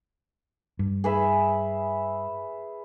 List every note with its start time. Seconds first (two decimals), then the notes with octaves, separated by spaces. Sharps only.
0.79 G2
1.04 G#4 B4 E5